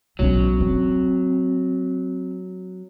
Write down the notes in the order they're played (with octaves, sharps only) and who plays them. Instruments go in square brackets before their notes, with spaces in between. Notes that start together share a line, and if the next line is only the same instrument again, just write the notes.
[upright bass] B1 C#4 [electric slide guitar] F#3
[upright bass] C4